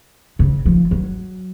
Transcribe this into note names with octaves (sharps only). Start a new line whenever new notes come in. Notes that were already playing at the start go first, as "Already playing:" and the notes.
C#3
F3
F#3